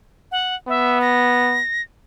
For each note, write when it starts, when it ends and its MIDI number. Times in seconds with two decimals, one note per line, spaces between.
0.31 0.55 78
0.69 1.61 59
0.69 0.99 76
1.02 1.82 94